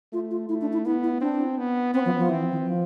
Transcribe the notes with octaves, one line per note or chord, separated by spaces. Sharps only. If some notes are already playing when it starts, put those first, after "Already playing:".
A3 F4
F4
A3 E4
D4
E4
B3 E4
E4
C4 D4
B3
B3 C4
F3
F3
E3 C4
E3
F3